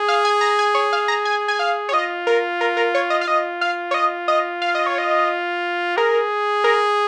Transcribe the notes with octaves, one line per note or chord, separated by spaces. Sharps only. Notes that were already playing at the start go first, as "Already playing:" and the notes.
Already playing: G#4
F5
G#5
A#5
G#5
C#5
F5
A#5
G#5
G#5
F5
C#5
F4 D#5
A#4
A#4
A#4
C#5
D#5
F5
F4 D#5
F5
C#5
D#5
D#5
F5
D#5
C#5
D#5
G#4 A#4
A#4